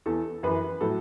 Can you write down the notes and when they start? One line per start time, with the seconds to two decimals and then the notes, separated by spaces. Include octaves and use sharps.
0.06 E2 E3 A4
0.43 F#2 E3 B4
0.81 A2 F#3 A4